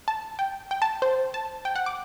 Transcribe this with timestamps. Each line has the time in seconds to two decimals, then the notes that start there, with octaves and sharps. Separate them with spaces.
0.08 A5
0.39 G5
0.71 G5
0.82 A5
1.02 C5
1.34 A5
1.65 G5
1.76 F#5
1.86 D6